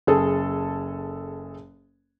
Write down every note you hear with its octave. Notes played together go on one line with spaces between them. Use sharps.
F#1 G#4 A4